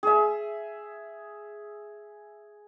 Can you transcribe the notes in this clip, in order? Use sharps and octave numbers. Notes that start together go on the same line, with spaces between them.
G#4 E5